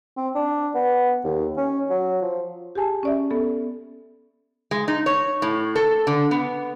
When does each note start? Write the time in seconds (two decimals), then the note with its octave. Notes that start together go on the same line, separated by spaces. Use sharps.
0.17 C4
0.35 D4
0.75 B3
1.24 D#2
1.57 C#4
1.90 F#3
2.22 F3
2.75 G4 G#4 G#5 A5
3.03 C#4 D5 E5
3.31 B3 A4
4.71 G#3
4.88 D#4
5.06 C#5
5.42 A2
5.76 A4
6.07 D3
6.31 B3